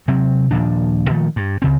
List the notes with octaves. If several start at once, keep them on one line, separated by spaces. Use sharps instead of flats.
C3 F#3 C4
D#1 A#2 F3 D4
A#2 D#3 F3 A3
G2
C#2 C#3 C4